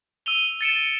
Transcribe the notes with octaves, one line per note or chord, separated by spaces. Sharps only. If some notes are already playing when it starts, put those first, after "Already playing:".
E6 D#7 F7 G7
A6 C#7 D7 E7